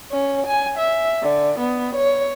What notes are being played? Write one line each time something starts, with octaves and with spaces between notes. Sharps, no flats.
C#4
G#5
E5
D3
B3
C#5